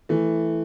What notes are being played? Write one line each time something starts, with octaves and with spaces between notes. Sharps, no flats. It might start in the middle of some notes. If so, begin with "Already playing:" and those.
E3 A3